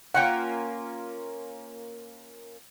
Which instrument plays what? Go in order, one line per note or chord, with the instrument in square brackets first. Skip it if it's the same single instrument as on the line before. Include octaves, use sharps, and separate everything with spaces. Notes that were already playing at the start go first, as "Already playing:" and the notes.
[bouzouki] A#3 C#4 F4 [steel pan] F#5 G5